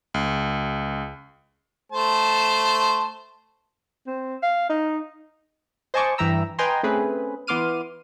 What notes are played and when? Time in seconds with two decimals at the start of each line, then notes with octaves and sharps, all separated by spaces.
0.14 C#2
1.92 A3 C5 A5
4.07 C4
4.42 F5
4.69 D#4
5.94 C5 D#5 G#5 A5 C#6 D6
6.18 G2 E3 E5 G5 A#5 E6
6.59 B4 D#5 G5 G#5 A#5 C6
6.83 A3 C4 C#4 G#4 B4
7.47 E3 B3 C6 D6 F6 D#7